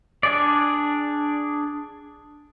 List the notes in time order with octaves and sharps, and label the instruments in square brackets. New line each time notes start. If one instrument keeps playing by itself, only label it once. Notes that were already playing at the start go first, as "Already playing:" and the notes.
[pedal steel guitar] D4 G#4 D5